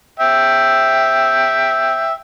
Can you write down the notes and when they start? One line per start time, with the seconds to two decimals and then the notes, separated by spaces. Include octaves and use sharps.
0.20 E5 G5